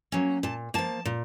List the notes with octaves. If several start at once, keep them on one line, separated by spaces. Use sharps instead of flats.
F#3 A#3 C#4
A#2 A5
F3 A#3 A5
A#2